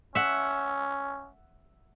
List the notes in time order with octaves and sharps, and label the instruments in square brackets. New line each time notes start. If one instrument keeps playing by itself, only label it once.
[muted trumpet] C#4 [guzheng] E5 F#5